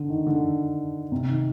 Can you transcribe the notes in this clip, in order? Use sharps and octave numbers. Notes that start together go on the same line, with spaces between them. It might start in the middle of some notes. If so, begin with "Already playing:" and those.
Already playing: D3
D#3
D3
C3
D#3